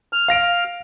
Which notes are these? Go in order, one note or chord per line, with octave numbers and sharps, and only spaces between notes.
F6
F5 A#6 D7